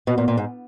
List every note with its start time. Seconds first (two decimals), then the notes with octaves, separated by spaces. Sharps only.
0.07 B2
0.18 A#2
0.28 A#2
0.37 G#2